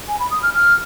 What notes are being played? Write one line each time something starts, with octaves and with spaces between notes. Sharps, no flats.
G#5
B5
D#6
F6
F6